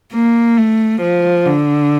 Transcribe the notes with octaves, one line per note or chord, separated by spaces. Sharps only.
A#3
A3
F3
D3